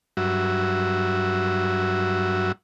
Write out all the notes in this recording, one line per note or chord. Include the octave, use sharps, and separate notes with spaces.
G2 F#3 F#4 E5